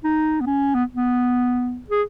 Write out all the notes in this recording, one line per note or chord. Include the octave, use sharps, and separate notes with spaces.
D#4
B3
C#4
B3
B3
G#4